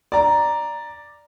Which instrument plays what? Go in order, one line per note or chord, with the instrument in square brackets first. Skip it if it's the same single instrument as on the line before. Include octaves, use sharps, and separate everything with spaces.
[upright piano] D5 A#5